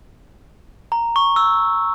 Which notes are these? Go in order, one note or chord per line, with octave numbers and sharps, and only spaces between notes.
A#5
C#6
E6